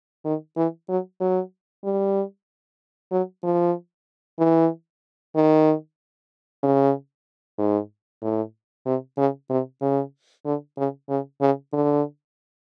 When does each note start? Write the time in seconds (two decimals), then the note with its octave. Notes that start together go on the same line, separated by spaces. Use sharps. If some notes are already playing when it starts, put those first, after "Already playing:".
0.25 D#3
0.56 E3
0.89 F#3
1.21 F#3
1.84 G3
3.11 F#3
3.44 F3
4.39 E3
5.35 D#3
6.63 C#3
7.58 G#2
8.22 A2
8.86 C3
9.18 C#3
9.50 C3
9.82 C#3
10.45 D3
10.77 C#3
11.09 C#3
11.41 C#3
11.73 D3